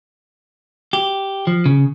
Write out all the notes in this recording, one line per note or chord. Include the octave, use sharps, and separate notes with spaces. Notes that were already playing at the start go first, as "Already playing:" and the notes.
G4
F3
C#3